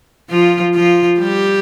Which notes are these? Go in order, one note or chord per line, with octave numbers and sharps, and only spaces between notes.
F3 F4
F3 F4
G3 G4